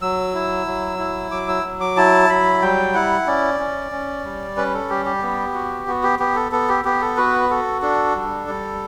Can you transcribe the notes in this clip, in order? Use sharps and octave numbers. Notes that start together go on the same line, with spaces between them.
F#3 E6
E4
F#3
E4
F#3 D6
E6
F#3
D6
E4 A5
F#3 B5
G3 G5
E4 F#5
C#4 D5
C#4
C#4
G3
C#4 B4
A4
G3 G4
G4
B3
F#4
B3 F#4
G4
B3 G4
A4
B3 A4
G4
B3 G4
A4
F#4 B4
F#4 A4
D4 A4
G3
G3